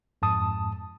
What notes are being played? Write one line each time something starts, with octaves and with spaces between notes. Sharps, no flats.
F2 G#2 A5 D#6